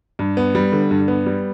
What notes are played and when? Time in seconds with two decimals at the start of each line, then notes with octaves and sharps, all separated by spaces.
0.19 G2
0.37 B3
0.55 G3
0.72 D3
0.91 G2
1.08 B3
1.26 G3